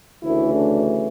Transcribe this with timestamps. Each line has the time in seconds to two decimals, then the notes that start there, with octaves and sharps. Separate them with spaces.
0.23 D2 C#3 E3 A3 E4
0.54 D4